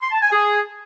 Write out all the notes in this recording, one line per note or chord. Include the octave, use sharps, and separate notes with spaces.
C6
A5
G#5
G#4